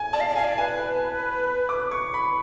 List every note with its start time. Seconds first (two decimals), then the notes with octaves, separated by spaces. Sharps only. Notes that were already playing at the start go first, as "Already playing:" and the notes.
Already playing: G#5
0.13 D5 A5
0.20 F5
0.29 D5
0.36 F5 G#5
0.44 D5
0.58 B4 G#5
1.69 D6
1.91 C#6
2.14 B5